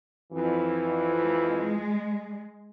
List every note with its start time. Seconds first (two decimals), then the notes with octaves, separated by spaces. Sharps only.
0.33 F2 E3
1.23 G#3